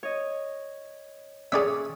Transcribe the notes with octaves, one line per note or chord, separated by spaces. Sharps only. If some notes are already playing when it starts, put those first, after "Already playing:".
C#5 D#5
C#4 G#4 D5 E5